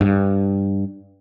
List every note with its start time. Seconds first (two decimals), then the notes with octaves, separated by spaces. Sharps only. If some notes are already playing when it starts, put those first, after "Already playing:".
0.01 G2